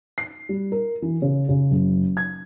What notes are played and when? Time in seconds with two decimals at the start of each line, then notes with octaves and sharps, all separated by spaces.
0.18 C7
0.49 G3
0.72 A#4
1.02 E3
1.22 C#3
1.49 C#3
1.71 F#1
2.17 G#6